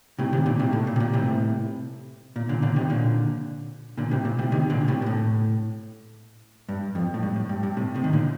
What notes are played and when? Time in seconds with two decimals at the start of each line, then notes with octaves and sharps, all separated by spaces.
0.19 A2 C3
0.33 C3 D#3
0.46 A#2 D3
0.59 A2 C3
0.73 A2
0.87 A#2
0.96 C3
1.00 A#2
1.13 A2 C3
2.36 A#2
2.49 A#2 D3
2.62 A#2 D3
2.76 C3 D#3
2.90 A#2 D3
3.97 A#2 D3
4.11 A2 C3
4.25 A#2
4.39 A2 C3
4.52 C3 D#3
4.70 A#2 D3
4.88 A2 C3
5.02 A#2
5.06 A2
6.69 G2
6.95 F2
7.14 A2
7.23 G2
7.36 A2
7.49 G2
7.63 G2
7.77 A2 C3
7.95 A2 C3
8.04 D#3
8.13 A#2 D3